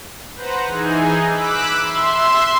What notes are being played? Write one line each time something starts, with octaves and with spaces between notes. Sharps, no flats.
B4 C5 F#5 A#5
E3 D#4 G#4
B5 D6 E6 F#6
E5 C6